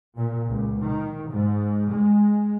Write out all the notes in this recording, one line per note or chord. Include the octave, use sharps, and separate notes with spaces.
A#2
C#2
D#3
G#2
G#3